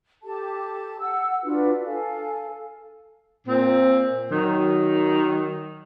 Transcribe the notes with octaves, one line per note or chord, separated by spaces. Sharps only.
G4 A4 A5
F#5 E6
D4 F4 F#4 B4
A4 F5 G#5
A#2 C4
D#3 F#3